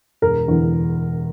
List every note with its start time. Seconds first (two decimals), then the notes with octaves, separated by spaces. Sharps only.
0.22 E1 A#4
0.47 E2 D3